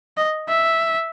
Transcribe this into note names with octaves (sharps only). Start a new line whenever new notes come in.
D#5
E5